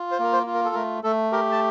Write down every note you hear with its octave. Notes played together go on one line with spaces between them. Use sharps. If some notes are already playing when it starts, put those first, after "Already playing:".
Already playing: F4
C5
A#3 A#4
C5
F4
A#4
A4
A3 A#4
A3 A4
G4 A#4
A5